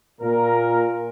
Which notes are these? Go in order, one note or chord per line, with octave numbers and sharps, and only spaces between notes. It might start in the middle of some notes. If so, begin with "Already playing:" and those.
A#2 A#4